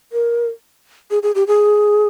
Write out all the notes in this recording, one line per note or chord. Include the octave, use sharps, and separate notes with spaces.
A#4
G#4
G#4
G4
G#4